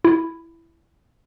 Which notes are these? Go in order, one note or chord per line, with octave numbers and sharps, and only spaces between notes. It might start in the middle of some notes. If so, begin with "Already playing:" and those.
E4